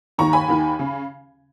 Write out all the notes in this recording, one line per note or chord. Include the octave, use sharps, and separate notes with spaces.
D#2 D#3 A#5 C#6
G#5 B5
D#2 D#3
C#3